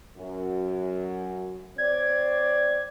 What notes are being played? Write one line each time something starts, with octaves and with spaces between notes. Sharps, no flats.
F#2
C4 C#5 D5 G#6